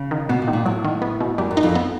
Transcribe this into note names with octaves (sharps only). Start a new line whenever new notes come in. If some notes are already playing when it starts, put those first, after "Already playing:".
Already playing: C#3
D#3
B2 B3
A#2
D#3
A#2
A2 F#3
D#3
B3
B2
F#2 G3
F#2
D#4
F2
B3